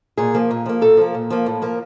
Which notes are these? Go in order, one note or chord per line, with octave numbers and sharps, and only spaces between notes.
A#2 G#4
F3 A#3
A#2
F3 A#3
A#2 A4
F3 A#3
A#2
F3 A#3
A2
F3 A#3